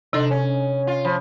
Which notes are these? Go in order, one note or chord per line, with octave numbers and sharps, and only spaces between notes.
C3 D4 D#4 A4 C6
C#4
F4
F3 B5